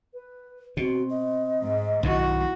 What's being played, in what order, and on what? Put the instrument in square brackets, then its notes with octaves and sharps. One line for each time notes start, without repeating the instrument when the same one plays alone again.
[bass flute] B4
[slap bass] B2 [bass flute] C4 [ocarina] F#4
[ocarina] D#5
[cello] G#2
[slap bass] B1 G2 D#3 [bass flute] E4 [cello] F#4